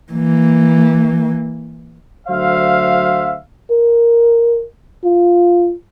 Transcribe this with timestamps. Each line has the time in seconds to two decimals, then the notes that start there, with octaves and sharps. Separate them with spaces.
0.12 E3 A#3
2.27 D2 F#3 C5 E5 F5
3.71 A#4
5.03 F4